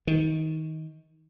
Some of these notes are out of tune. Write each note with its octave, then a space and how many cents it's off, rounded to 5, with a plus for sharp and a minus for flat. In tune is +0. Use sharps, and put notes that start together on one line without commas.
D#3 +20